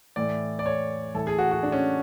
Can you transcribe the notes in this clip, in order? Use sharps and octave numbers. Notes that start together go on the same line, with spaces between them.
A2 E3 D5
D5
C#5
A2 E3 A4
G#4
F#4
F#4
D4
C#4